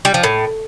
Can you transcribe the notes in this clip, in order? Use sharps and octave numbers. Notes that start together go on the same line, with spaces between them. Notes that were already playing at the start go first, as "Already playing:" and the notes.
G3
F3
A2